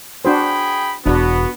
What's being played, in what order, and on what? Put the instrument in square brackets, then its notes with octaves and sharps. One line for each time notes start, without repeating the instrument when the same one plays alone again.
[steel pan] D4 F#4 C5 [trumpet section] G#4 G5 B5
[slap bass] E1 E2 [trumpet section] B3 [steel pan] D4 B4 [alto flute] F#4